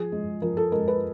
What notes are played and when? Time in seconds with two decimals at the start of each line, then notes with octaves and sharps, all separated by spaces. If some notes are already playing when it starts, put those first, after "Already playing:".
Already playing: F3 G#4
0.12 G#3
0.42 F3 A#4
0.57 A4
0.72 G#3 A#4
0.88 B4